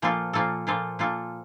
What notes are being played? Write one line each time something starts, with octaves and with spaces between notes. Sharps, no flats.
A#2 F3 A#3 F4 A4
A#2 F3 A#3 F4 A4
A#2 F3 A#3 F4 A4
A#2 F3 A#3 F4 A4